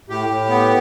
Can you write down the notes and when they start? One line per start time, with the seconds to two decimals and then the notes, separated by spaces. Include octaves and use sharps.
0.09 A2 G4
0.29 A2
0.49 B3